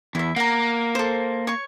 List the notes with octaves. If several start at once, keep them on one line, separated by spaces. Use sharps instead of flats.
E2 E4 E5
A#3 F#5 A#5
A4 C5
C#5 C#6